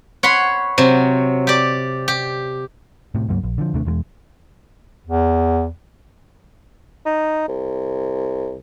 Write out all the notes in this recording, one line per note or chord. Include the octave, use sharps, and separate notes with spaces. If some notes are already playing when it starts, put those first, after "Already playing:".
C#5 F#5 B5 C6
C3 F#3
G4 D5
G4
A2 C3
C#2 G2 F#3 A#3
A#1
D3 F3
D#2 C3 A3 D4
E1 E2 F#3 G#3
E2
D#4
C2